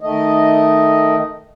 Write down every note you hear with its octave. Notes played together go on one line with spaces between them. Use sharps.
D#3 A3 D#5